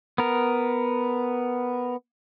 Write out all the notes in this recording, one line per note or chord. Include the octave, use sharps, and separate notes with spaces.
B3 A#4